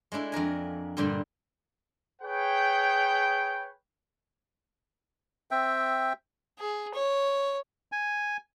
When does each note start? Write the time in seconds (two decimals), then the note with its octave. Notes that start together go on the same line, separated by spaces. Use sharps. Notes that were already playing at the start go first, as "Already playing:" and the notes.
0.12 G#3 A3 D4 E4
0.32 F2 D4 A#4 G#5
0.97 G2 A#2 D3 G3
2.22 G#4 B4 C#5 G5
5.51 C4 E5 G5
6.59 G#4
6.94 C#5
7.92 G#5